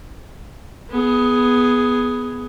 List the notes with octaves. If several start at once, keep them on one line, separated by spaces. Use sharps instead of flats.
B3 G#4